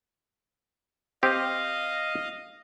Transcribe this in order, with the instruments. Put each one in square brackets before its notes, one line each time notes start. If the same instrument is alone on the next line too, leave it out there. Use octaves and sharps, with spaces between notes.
[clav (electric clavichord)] C4 G4 [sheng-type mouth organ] D#5 F5